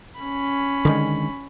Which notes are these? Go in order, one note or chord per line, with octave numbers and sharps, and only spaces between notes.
C#4 B5
D3 D#3 G#3